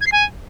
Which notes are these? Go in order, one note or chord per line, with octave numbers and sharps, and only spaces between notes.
G#6
C7
G#5